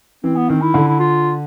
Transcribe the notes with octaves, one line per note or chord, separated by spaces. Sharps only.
E3 C4
B3
D#3 C4
E4
D3
E4
F4